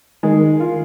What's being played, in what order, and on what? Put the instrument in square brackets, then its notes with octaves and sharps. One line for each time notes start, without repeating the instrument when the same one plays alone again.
[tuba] D#3 [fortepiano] G#3
[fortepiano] F4